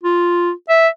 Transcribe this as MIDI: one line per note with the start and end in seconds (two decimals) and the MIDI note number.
0.03 0.52 65
0.69 0.88 76